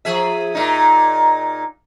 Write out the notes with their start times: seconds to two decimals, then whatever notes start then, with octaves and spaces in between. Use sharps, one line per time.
0.05 F3 G#4 E5
0.55 A#2 D#4